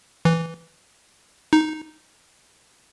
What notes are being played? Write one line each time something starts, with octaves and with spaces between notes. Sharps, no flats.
E3
D#4